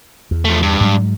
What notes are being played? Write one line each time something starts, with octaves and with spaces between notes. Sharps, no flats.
E2
F3 A3
G2
G#2 F#3 G#3